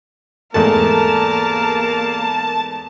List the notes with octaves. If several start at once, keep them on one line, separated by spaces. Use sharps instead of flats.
E2 G#2 A3 A#3 A#4 A5